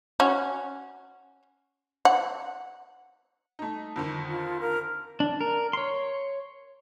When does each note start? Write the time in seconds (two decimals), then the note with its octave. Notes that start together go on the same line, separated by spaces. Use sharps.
0.20 C#4 F#4
2.05 F#5
3.59 A3 D#4
3.96 F2 D3 D#3
4.29 F4
4.60 A#4
5.20 D4
5.41 A#4
5.73 C#5 C6